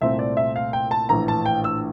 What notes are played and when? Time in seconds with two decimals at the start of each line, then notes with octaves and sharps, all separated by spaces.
0.01 C2 A#2 A3 C4 E5
0.19 D5
0.37 E5
0.56 F5
0.73 G5
0.91 A5
1.09 A#1 A2 E3 A3 A#5
1.28 A5
1.46 G5
1.64 E6